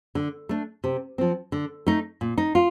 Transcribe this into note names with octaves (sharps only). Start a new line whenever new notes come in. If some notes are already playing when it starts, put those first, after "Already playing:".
D3
A3 D4
C3
F3 C4
D3
A3 D#4
A#2
D#4
F4